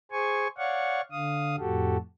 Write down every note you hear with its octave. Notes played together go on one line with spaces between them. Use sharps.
G#4 C5 G#5 C#6
C#5 D5 F5 F#5 C#6
D3 F5 D#6
F2 A2 F#4 G4 A4